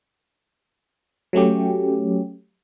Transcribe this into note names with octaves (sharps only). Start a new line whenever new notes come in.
F#3 A3 C#4 G4